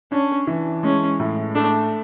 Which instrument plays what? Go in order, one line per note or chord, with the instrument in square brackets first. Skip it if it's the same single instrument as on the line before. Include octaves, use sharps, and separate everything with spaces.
[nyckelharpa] C#4 [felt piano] D4
[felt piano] E3
[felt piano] G#3 [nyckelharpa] C#4
[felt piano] A2
[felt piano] A3 [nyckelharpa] D4